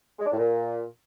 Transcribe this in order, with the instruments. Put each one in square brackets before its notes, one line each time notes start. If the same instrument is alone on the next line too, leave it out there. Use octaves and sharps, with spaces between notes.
[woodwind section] G#3
D4
A2
A#2